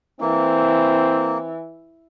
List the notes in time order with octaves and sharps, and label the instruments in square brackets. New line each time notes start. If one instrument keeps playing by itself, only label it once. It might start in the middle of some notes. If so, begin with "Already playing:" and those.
[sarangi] E3 [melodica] A#3 [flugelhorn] C4